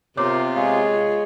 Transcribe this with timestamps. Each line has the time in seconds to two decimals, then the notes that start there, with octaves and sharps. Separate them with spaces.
0.17 C3 B3 F4 A#4 C5 C#5 D6
0.56 G#3 G#4 C#5 F5